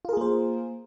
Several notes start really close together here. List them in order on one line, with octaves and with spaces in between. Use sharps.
F4 A#4 G#4 A#3 C5